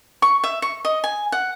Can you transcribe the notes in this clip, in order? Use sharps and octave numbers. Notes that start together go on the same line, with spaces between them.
C#6
E5
C#6
D#5
G#5
F#5